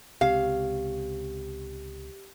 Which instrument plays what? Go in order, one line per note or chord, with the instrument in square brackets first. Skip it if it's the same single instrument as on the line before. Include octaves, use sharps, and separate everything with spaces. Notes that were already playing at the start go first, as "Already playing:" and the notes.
[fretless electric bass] C#2 C3 [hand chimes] G4 [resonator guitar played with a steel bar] F5